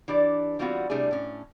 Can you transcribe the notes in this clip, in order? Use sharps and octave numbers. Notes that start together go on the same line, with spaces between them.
E3 D4 G4 B4 D5
E3 G3 B3 C4 F4 F#4
C3 G3 A3 D4 E4 G#4
A2 C#4